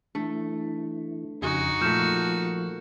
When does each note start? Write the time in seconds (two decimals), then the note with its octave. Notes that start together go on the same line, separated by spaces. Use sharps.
0.15 E3 A3 D4
1.42 F2 C#3 D#4 F#4 G#4
1.81 A#2 F3 A3 F6 G6 E7